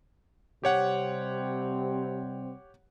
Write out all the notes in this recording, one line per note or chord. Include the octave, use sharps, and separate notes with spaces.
C3 G3 C4 G4 C#5 F#5